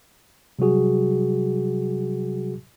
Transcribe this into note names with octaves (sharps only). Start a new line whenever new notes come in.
C3 F#3 G3 F#4 G#4